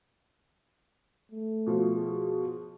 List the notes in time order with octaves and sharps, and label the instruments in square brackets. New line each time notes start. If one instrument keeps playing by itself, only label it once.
[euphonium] A3
[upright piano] B2 F3
[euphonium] G#4